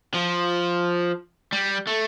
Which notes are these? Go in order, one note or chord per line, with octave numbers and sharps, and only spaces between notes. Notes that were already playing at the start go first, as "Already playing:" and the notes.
F3
G3
A3